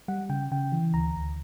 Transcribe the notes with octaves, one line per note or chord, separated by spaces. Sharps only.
G3 F#5
C#3 G5
C#3 G5
E3
D2 A#5
D2